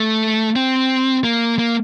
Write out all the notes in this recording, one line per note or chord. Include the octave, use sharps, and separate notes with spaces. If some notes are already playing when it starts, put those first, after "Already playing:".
Already playing: A3
C4
A#3
A#3